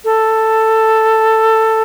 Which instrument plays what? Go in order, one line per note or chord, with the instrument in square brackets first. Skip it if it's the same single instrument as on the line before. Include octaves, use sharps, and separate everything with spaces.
[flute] A4